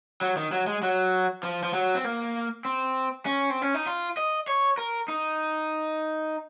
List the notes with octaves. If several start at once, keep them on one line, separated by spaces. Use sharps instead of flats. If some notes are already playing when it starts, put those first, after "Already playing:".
F#3
D#3
F#3
G#3
F#3
F3
F3
F#3
C4
A#3
C4
C#4
C4
C#4
D#4
F4
D#5
C#5
A#4
D#4